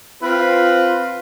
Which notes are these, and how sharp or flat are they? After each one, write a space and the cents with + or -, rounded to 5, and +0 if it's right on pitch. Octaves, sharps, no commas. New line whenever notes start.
C4 +0 F4 +0 B4 +0